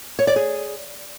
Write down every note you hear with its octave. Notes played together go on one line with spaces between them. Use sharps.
C#5
D5
G#4